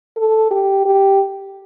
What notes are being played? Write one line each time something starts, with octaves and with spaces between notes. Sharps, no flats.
A4
G4
G4